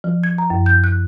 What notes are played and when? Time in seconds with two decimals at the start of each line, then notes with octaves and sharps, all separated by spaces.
0.04 F3
0.24 G#6
0.38 A#5
0.50 F#2
0.66 G6
0.84 F#6